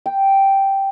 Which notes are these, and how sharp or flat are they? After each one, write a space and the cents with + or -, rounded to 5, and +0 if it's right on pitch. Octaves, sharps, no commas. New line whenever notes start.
G5 -5